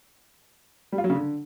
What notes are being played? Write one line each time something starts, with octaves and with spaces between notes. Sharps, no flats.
G3
F4
F#3
C#3
D3